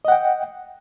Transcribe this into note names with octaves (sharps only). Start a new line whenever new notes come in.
D#5 F#5 G5